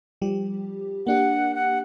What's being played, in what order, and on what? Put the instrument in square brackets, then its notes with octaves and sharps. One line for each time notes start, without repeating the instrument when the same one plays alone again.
[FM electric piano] F3 G3 G4
[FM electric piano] A#3 D4 G4 [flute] F#5
[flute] F#5